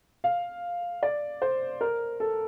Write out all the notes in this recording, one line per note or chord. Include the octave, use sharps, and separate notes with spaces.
F5
D5
C5
A#4
A4